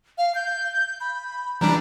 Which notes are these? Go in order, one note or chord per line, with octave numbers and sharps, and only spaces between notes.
F5
G6
B5
E3 G3 D4 A#5